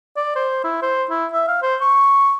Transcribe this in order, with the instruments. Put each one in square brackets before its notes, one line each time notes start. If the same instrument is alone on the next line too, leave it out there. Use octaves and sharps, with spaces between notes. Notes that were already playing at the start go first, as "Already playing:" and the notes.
[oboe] D5
C5
E4
C5
E4
E5
F5
C5
C#6